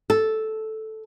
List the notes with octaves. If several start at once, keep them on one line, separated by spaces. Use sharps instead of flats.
A4